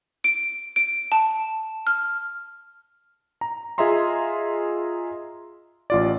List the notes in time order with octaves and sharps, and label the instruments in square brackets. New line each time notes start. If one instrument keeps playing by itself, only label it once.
[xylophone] D7
D7
A5
F6
[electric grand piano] A#5
F4 G#4 D#5 E5 A#5 C6
A1 F4 D5